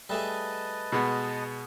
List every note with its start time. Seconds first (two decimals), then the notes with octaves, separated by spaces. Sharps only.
0.10 G3 A3 G#4 B4 D#5 A5
0.92 B2 G#3 B3